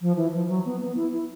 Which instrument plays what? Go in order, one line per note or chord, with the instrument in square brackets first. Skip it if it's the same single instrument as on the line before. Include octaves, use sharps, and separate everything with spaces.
[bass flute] F3
E3
F3
F#3
B3
B3
E4
E4